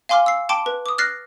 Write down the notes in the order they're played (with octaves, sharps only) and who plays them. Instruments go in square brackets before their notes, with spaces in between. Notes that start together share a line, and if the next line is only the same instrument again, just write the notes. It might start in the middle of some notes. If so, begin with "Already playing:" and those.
[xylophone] F5 G#5 C6 D6 F6 G7
E6 C7
G5 A5 C6 D6 D7
B4
D6 D#6
F6 F#6 A6 A#6 C7